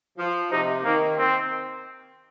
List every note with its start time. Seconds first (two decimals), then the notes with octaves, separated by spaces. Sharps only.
0.18 F3
0.51 C3 D#4
0.84 D#3 A#3
1.17 C4